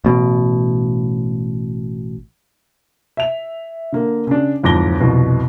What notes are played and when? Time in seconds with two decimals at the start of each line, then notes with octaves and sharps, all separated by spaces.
0.04 A1 B2
3.17 E5 F7
3.92 D3 A#3
4.27 C#3 D4
4.63 D1 F2 G#2 D6 A#6 G7
5.00 C2 F2 B2